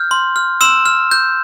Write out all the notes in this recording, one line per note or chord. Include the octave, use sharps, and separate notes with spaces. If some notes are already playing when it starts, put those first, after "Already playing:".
Already playing: F6 G6
C6
F6
C6 E6 E7
F6
G6